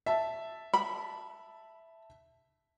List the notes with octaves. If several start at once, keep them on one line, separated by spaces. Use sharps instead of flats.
E5 A5
B5